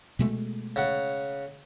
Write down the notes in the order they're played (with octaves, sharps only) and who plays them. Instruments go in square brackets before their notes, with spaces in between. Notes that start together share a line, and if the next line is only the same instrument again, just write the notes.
[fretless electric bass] B2 G#3 A3
[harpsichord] C#3 F#5